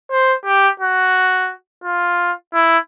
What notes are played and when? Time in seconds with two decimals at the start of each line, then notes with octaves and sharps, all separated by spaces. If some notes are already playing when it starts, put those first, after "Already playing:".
0.11 C5
0.45 G4
0.80 F#4
1.84 F4
2.54 E4